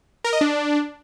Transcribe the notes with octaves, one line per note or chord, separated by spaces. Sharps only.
A#4
D#5
D4